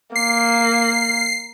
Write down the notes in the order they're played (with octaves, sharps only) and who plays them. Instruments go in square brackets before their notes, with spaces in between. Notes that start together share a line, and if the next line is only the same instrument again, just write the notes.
[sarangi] A#3 [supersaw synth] C7